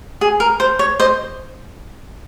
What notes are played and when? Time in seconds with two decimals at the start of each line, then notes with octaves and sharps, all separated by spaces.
0.21 G#4
0.40 A#4
0.60 C5
0.79 C#5
1.00 C5 D#5